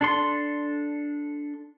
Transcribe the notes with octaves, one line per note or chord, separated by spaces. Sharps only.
D4 A4 C6